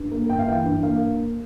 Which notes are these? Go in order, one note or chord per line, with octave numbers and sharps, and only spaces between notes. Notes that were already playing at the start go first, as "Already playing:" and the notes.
Already playing: G2
A#3
G1 G5
F5
E3 G5
G2
A#3 F5